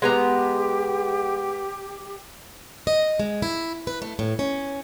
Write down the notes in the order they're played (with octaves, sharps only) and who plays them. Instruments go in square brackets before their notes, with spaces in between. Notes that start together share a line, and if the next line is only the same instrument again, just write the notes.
[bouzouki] G#3 B3 A#5 [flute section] G4
[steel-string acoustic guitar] D#5
G#3
E4
B4
A3
A2
C#4